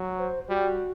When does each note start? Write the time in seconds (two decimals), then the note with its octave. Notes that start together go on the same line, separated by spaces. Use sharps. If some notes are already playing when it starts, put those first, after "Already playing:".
Already playing: F#3
0.18 C5
0.49 G3 F#4